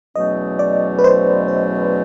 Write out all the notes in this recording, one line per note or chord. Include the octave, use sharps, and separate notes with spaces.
E2 B2 F#3 A3 C#4 D#5
D5
B4
C5
C5